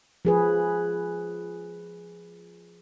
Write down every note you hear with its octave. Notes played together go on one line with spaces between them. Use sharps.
F3 G#4 B4